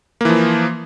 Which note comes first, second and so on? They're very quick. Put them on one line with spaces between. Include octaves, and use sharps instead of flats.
A#3 E3 F3